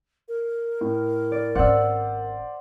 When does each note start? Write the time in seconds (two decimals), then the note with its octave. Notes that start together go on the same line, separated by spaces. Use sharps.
0.28 A#4
0.81 A2
1.32 D5
1.55 G#1 C#4 C5 D5 F#5 E6